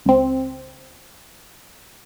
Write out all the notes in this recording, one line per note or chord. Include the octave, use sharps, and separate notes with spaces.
C#2 C4